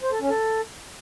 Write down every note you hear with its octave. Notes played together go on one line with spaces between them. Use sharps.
C5
A4
C#4
A4